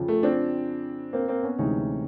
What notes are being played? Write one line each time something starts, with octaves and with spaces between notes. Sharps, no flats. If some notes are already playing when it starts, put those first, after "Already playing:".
Already playing: F2 C#3 F3
A3
C4 D4
A#3 C4
A#3 C4
B3 C#4
D2 C3 E3 G#3 C#4 D#4